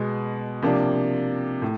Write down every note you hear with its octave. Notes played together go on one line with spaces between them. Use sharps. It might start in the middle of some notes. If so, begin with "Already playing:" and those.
Already playing: B2 G#3 B3
C3 F3 A#3 D4
A2